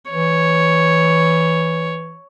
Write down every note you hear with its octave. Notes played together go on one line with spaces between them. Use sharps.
E3 C#5